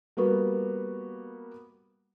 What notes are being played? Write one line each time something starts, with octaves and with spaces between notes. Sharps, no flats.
G3 A#3 B3 F#4